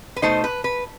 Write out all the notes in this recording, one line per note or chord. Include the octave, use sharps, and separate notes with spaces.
B4
B2 A3 D#4 C5
B4
B4